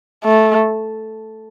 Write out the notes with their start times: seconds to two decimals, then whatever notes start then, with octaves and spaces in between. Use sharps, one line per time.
0.24 A3